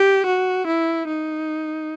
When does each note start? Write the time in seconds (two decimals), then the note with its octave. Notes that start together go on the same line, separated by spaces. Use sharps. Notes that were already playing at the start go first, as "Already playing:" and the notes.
Already playing: G4
0.26 F#4
0.67 E4
1.07 D#4